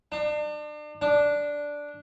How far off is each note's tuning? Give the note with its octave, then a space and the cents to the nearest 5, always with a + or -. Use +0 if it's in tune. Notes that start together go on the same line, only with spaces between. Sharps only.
D4 +35
D4 -5